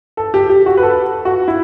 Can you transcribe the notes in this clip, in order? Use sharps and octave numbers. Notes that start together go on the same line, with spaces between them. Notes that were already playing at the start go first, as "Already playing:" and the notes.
A4
G4
G4
F#4
B4
A4
F#4
E4